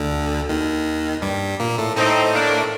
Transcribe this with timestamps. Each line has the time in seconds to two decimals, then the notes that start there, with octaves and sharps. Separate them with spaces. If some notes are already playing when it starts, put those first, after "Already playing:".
Already playing: D2 D3
0.49 D#2 D#3
1.22 G2 G3
1.60 A#2 A#3
1.78 A2 A3
1.97 A2 A3 C4 D#4
2.33 A#3 D4